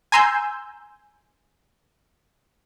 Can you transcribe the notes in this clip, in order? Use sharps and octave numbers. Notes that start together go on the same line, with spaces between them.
G#5 A#5 C6 E6 G6